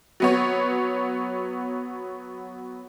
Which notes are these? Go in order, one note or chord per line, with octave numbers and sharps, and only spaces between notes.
F#3 B3 C#5